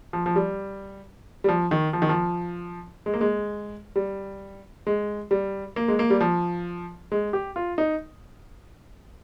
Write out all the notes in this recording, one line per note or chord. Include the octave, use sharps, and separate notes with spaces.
F3
F3
G3
G3
F3
D#3
F3
D#3
F3
G#3
A#3
G#3
G3
G#3
G3
A#3
G#3
A#3
G3
F3
G#3
G4
F4
D#4